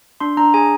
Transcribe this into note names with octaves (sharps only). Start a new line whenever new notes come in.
D4 C6
D4 A#5
G#4 G#5